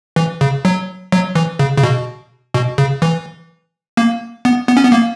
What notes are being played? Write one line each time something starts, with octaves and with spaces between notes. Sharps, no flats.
E3
C#3
F#3
F#3
E3
C#3
C#3
B2
B2
C#3
E3
A#3
B3
B3
C#4
B3
A#3